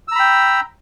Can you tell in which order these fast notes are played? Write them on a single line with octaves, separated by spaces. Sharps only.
E6 A#5 B5 G5